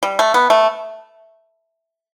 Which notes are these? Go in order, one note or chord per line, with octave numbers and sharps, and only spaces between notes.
G3
A3
B3
A3